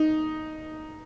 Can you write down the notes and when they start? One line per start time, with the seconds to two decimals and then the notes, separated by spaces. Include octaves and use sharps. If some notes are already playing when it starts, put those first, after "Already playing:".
Already playing: D#4